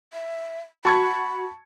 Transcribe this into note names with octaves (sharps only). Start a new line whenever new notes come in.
E5
F#4 A5 B5 C#6 G#6